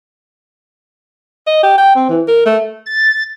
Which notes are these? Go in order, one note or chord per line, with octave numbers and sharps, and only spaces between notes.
D#5
G4
G5
C4
E3
A#4
A3
A6